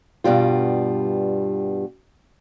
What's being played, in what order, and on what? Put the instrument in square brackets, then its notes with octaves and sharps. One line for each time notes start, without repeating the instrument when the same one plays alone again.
[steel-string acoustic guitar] G2 B2 G3 F4